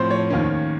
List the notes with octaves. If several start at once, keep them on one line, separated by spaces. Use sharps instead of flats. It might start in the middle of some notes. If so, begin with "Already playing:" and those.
Already playing: A2 F3 A3 C4 C5 C#5
C#5
D#2 D#3 A#3 C#4